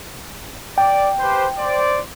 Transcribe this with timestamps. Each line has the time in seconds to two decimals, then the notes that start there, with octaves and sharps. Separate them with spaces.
0.78 D5 G5
1.19 G4 B4 C5
1.58 C5 D5